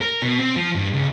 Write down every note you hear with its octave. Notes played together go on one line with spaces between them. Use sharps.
A#4
B2
C4
F3
G2
C#2